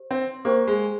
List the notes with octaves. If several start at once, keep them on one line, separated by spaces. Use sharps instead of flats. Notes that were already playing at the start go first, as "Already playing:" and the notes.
Already playing: G4 C5
C4
A#3 G4 C5 G5 C#6
G#3